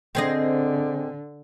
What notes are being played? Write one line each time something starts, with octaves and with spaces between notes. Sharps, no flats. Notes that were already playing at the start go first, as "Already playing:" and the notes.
D3 C4 G#4 D#5